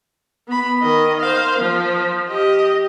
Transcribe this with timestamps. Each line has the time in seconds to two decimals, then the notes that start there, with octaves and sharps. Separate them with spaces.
0.48 B3 B5
0.82 D#3 D#5
1.21 C5 F5
1.59 F3
2.29 G4 D#5